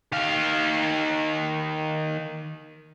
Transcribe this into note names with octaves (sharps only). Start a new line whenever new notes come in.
D#3 F5